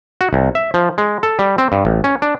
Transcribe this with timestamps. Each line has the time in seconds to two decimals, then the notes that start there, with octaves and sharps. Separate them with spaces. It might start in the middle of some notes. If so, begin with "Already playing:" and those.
0.21 F#4
0.33 C2
0.55 E5
0.74 F3
0.98 G#3
1.23 A4
1.39 G3
1.58 C4
1.72 G2
1.85 A1
2.04 C#4
2.22 D4